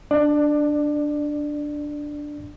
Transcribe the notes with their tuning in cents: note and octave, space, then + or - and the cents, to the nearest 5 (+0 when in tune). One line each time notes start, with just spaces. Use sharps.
D4 +0 D5 +25